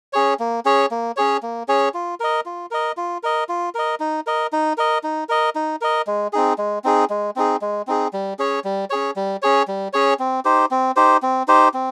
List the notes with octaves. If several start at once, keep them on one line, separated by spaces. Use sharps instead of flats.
C#4 G#4 C#5
A#3
C#4 G#4 C#5
A#3
C#4 G#4 C#5
A#3
C#4 G#4 C#5
F4
A#4 D#5
F4
A#4 D#5
F4
A#4 D#5
F4
A#4 D#5
D#4
A#4 D#5
D#4
A#4 D#5
D#4
A#4 D#5
D#4
A#4 D#5
G#3
C4 D#4 G#4
G#3
C4 D#4 G#4
G#3
C4 D#4 G#4
G#3
C4 D#4 G#4
G3
C#4 G#4 C#5
G3
C#4 G#4 C#5
G3
C#4 G#4 C#5
G3
C#4 G#4 C#5
C4
D#4 G4 C5
C4
D#4 G4 C5
C4
D#4 G4 C5
C4